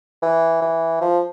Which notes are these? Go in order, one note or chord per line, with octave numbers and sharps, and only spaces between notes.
E3
E3
F3